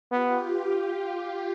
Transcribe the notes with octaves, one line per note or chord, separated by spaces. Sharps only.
B3 F4 G4
F4